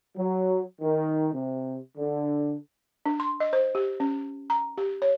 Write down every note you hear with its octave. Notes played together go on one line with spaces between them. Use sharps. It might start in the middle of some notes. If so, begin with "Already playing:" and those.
F#3
D#3
C3
D3
D4
C6
D#5
C5
G4
C#4
A#5
G4
C#5